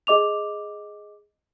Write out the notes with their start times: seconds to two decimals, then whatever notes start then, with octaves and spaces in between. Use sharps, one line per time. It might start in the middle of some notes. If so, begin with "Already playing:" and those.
0.07 G#4 D#5 D6 F7